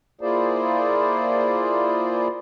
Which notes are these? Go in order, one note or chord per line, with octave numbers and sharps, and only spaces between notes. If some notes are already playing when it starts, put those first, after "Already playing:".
A#3 E4 F4 G#4 C5 D5